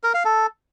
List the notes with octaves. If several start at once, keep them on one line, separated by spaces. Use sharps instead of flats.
A#4
F5
A4